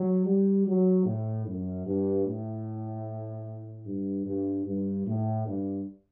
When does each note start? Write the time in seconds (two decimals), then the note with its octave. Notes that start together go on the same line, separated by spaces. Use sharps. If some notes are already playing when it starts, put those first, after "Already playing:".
Already playing: F#3
0.26 G3
0.66 F#3
1.06 A2
1.46 F#2
1.86 G2
2.26 A2
3.86 G2
4.26 G2
4.66 G2
5.06 A2
5.47 G2